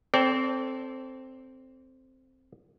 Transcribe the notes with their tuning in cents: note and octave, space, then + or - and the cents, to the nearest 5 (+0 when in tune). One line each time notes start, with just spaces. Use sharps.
C4 +0 A4 +0 D5 -35